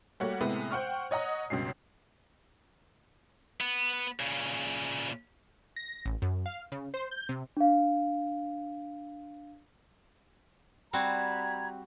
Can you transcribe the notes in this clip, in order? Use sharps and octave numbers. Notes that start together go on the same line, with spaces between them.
G3 A3 A#3 F#4 C#5 F#5
A2 C3 G#3 B3
C5 F#5 G5 C#6 F6
C#5 D#5 F#5 A#5 D#6
C#2 G2 B2 C#4 C7
B3
A#2 C#3
A#6
A1
F#2
F5
C#3
C5
G6
C3
D4 F5
G3 C4 F#4 A#5 B5 G#6